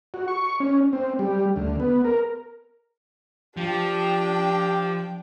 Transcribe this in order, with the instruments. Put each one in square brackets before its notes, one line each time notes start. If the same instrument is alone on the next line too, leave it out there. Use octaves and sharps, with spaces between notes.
[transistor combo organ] F#4
C#6
C#4
C4
G3
D2
B3
A#4
[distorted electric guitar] F3 [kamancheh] D4 G5 [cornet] G4